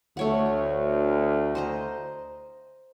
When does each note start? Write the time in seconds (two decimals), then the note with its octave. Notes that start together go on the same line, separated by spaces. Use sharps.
0.17 D2 A3 C#5 F#5
1.55 C5 D#5 A#5